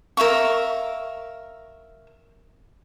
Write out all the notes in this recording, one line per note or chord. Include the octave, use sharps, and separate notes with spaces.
A#4 E5 F5 C#6